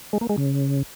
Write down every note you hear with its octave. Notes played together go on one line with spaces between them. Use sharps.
G#3
A#3
G#3
C#3